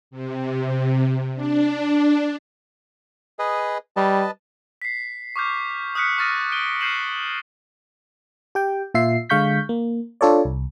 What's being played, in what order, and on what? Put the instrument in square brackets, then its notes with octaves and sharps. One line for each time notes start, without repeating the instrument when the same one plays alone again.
[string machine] C3
D4
[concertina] G#4 B4 D#5
[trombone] G3 [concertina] B4 D#5 A5
[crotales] B6 C7
C#6 D6 F6 G6
D#6 F6 F#6 B6 C#7
C#6 D#6 F6 A6 A#6 D#7
F6 D7 D#7 G7
F6 G6 C7 D#7 E7 F#7
[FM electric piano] G4 G5
A#2 F4 E5 C7
D3 G#3 F5 C#6 G6 B6
A#3
D4 F4 A4 C#5 D5
C2